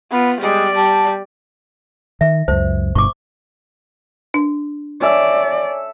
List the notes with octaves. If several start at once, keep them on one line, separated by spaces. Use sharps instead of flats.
B3 F4 B5
G3 G#3 D5
G3 A5
D#3 E5
C#2 F#2 C5
G1 G2 B2 C#6 D6
D4
A4 C#5 D5 E5 G#5